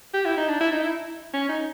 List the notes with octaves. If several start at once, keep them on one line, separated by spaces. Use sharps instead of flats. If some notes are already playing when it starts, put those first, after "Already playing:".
G4
E4
D#4
D4
E4
D#4
E4
C#4
D#4